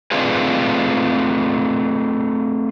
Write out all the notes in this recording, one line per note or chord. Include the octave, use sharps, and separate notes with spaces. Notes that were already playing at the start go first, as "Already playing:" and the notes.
A3 C4 D4 F4 G#4 B4